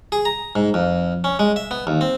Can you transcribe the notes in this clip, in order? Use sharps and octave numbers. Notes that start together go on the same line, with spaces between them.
G#4
A#5
G#2
F2
C#4
G#3
E5
B3
D#2
C4